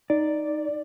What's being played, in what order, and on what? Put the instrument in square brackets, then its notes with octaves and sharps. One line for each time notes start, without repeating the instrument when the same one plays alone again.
[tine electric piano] D#4 [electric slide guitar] D5